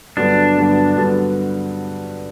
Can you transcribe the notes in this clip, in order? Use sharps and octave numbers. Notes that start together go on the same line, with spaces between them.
G2 D3 F#3 B3 D4
G2 D3 F#3 B3
G2 D3 F#3 B3